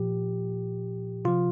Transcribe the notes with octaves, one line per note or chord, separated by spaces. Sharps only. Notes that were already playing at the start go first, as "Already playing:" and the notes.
Already playing: A#2 F3 G4
C3 F3 F4